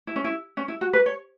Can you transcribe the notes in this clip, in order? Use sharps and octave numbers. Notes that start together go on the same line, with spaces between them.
E4
C#4
E4
C#4
E4
F#4
B4
C#5